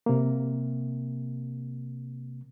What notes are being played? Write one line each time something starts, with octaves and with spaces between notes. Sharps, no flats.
C3 A#3